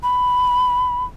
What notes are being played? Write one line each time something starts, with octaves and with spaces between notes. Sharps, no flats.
B5